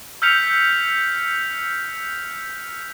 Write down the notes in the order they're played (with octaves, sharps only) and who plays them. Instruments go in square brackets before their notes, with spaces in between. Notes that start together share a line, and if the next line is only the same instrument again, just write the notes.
[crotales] E6 F6 G6 B6 C#7 F7